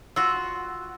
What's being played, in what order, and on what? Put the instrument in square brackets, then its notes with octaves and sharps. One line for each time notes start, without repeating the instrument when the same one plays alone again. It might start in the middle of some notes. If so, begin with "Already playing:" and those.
[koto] F4 F#4 [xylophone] E6